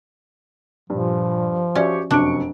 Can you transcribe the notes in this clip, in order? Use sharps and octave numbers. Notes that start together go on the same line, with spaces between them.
G2 A#2 F3
C#4 F#4 G4 C#5 D5 E5 C#6
F1 F#2 D4 C#6 D7